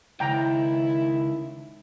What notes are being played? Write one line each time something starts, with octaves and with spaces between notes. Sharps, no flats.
C#2 D#3 E4 G5 A#5